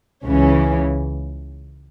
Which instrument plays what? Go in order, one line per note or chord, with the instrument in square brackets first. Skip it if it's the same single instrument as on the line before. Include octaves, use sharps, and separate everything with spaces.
[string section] C#2 C#3 E3 C#4